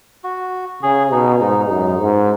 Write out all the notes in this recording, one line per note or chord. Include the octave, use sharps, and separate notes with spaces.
F#4
C#3 G#4
B2 D#4
G#2 D#4
F#2 D#4
G#2